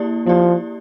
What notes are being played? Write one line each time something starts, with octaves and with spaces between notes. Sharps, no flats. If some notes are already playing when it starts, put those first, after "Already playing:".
Already playing: A#3 E4 G4 D5
F3 A#3 E4 G4 D5